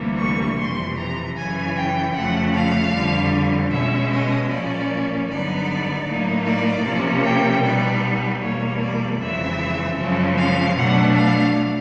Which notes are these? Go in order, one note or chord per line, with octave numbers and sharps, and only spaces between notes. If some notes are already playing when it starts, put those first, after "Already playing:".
Already playing: D2 C3 E3 G3 A#3
C#6
F2 C3 E3 C6
A#5
F#2 C#3 E3 G#5
G5
F2 C#3 F3 A3 F#5
F5
F2 D3 G3
B2 G#3 C#4 E5
D#5
A#2 F3 A#3 C#4 D5
G2 D3 F#3 B3 D#4 D5
A2 F#3 A#3 D#4
D5
C3 F3 A#3 C#4
G5
B2 G3 B3 D#4 D5
E2 B2 G3 A#3 C#5
D5
F2 C#3 E3 G#3 C4 E5
F#2 C#3 F3 G#3 C4
F5
B2 F#3 A3 D4 F#5
F5